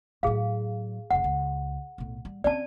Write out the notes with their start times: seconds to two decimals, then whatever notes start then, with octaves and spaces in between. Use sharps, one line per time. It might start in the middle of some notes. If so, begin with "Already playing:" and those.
0.23 A2 F#3 G#4 F5
1.10 F1 C#2 F#5
1.24 C#2
1.98 B1 A2
2.25 G3
2.44 C4 C#4 D5 A5